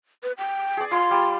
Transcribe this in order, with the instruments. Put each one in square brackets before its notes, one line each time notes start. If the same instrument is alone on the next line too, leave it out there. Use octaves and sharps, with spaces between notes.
[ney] B4
G5
[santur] G#4 D5
[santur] F4 [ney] C6
[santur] G3